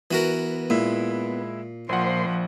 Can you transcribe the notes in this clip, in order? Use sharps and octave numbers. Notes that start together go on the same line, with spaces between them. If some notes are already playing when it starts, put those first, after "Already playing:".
E3 B3 F#4 A#4
A#2 G#3 E4 E5
A#1 A#2 F3 C5 F#5 C6